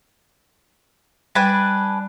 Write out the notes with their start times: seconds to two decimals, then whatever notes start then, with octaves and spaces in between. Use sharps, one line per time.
1.35 G3 D4 B4 G#5